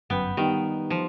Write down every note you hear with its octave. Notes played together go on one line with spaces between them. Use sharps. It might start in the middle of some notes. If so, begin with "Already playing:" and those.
G1 F#2 B3 G5
D#3 G3 B3 D#4
F3